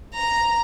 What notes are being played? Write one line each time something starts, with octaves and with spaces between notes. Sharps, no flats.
A#5